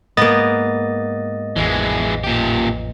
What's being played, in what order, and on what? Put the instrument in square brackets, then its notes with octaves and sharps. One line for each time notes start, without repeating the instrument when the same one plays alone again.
[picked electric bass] G#2 [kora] A#3 B3 [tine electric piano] D#5 A6
[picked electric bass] A1 F2 [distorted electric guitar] E3 G#3
[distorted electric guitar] A#2 G4